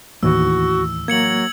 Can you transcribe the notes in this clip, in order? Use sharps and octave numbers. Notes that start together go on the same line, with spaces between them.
D#2 A2 E3 F#4 E6
F#3 A#3 G#6 C#7 F#7